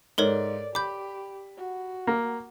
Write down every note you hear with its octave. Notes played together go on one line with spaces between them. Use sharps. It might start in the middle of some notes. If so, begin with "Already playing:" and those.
G#2 A4 A#4 C#5 D5
G4 B5 D6 G6
F#4
A#3